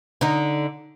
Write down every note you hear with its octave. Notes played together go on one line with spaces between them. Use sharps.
D3 D#4